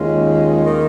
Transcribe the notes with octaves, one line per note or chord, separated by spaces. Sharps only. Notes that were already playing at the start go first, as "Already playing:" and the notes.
Already playing: D#2 D#3 G#3 C#4 F4
D#3 A#3 F4